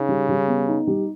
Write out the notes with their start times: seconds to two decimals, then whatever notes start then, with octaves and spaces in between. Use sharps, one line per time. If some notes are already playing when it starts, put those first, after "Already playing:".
Already playing: C#3 D#4
0.09 G3
0.29 G3
0.48 B3
0.68 D#4
0.87 G3